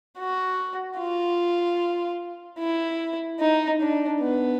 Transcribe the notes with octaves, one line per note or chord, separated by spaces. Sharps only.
F#4
F4
E4
D#4
D4
B3